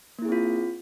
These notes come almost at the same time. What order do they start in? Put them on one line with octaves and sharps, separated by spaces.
A#3 E4 G#4 C4 F4